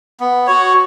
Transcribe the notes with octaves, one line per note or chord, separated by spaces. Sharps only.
B3
F#4 C#5